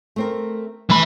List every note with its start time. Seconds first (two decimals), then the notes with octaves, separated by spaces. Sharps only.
0.16 A3 C4 A#4
0.90 E3 A3 G#5 B5